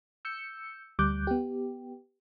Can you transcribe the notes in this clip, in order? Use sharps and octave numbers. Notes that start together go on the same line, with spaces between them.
E6 G6 C#7
D2 G3 D6 F#6 G6
B3 G4